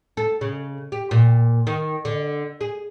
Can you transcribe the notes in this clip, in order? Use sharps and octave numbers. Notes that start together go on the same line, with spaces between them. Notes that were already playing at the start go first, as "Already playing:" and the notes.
A4
C#3
G4
A#2
D#3
D3
G#4